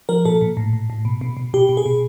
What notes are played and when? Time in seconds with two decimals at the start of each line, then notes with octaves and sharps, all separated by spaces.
0.09 F3 A#4
0.25 A#2 A4
0.41 A#2
0.57 A2
0.73 A2
0.90 A2
1.05 B2
1.21 B2
1.37 B2
1.53 B2 G4
1.69 B2
1.77 G#4
1.86 B2